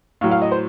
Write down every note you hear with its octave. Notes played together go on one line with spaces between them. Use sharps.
A2 F#3 F5
F5
D#5
C5